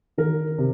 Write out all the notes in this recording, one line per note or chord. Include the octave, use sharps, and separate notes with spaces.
D#3 A#4
C3